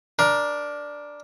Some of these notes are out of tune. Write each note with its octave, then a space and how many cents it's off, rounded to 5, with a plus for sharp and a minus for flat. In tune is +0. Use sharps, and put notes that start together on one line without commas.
D4 +0 A#4 +15